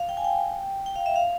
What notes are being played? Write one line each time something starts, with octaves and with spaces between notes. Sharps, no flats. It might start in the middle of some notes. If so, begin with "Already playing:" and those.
Already playing: F5
G5
G#5
G5
G5
F5
E5
F5